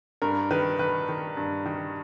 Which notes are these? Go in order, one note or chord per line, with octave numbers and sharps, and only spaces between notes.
G2 A#4
D#3 B4
D#3 B4
D#3
G2
D#3